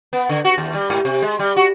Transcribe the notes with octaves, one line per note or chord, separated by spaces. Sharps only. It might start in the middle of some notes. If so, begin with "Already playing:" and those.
B3
D3
F#4
D#2
G3
G#2
C3
G#3
G3
F#4